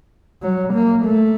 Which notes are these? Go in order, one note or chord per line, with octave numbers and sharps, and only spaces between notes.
F#3
A#3
A3